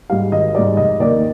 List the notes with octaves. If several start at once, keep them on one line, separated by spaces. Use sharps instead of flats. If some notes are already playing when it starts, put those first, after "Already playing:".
G#2 G3 F5
G#1 D#5
G#2 G3 D5
F1 D#5
D#2 D#3 D5